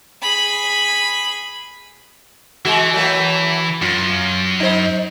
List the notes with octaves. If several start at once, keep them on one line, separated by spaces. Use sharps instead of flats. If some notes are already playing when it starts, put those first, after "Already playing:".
G#4 B5
E3 G#3 F#4
F#3 A3 A#3
F#2 F4
D#4 C5